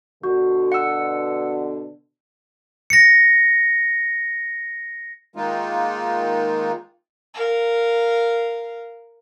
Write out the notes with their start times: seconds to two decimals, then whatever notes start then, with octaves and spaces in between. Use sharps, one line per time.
0.23 B2 D3 F#4
0.72 F#5 E6
2.90 A#6 C#7
5.36 D#3 G#3 A#3 D#4 F4
7.34 A#4 F5